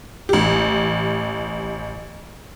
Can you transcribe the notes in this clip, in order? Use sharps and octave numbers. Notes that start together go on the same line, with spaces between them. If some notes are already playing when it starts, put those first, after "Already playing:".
A1 G4